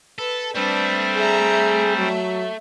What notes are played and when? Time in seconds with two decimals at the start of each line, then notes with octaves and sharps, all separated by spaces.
0.19 A4 B4
0.55 G3 A3 C4 D4 B4 C5
1.17 G#4 E5 A#5
1.97 F#3 E5